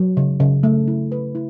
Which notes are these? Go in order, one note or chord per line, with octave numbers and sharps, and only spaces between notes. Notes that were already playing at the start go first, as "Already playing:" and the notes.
Already playing: F#3
C#3
C#3
A3
E4
B4
E4